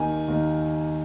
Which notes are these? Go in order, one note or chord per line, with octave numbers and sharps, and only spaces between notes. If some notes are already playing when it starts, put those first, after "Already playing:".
Already playing: D#2 D#3 G#5
D#2 D#3